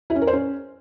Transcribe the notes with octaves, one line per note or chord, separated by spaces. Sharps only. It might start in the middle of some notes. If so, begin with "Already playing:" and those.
E4
C#4
A#4
C5
C#4